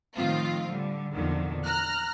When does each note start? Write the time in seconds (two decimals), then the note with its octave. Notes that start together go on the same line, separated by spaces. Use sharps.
0.17 A2 D#3 F3 C4 F4
0.69 D3 G3
1.13 E2 A#2 D3 D#3 F3
1.65 A#5 F6 F#6